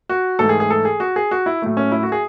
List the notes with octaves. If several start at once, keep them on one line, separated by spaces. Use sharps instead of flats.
F#4
G#2 E3 A3 A4
G#4
G#4
A4
G#4
F#4
G#4
F#4
E4
A2 F#3 A3
C#4
E4
F#4
G#4